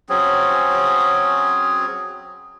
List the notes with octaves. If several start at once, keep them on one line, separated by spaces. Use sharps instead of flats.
F#3 C4 C#4 G#4